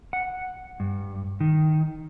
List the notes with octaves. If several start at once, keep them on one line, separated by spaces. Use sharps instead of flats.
F#5
G2
D#3